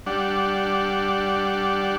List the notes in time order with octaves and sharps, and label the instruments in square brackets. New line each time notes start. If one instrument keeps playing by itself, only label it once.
[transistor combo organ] G3 D4 F#5